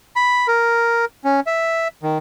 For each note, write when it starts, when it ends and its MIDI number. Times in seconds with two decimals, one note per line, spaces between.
0.16 0.47 83
0.48 1.05 70
1.25 1.40 61
1.47 1.88 76
2.03 2.18 51